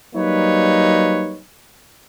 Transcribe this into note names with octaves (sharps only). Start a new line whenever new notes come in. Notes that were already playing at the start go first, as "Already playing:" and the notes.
F#3 G3 A#3 D#4 B4 C#5